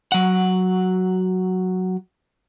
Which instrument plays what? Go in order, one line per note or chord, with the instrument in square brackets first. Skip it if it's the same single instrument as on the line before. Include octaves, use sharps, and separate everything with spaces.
[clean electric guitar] F#3 F#5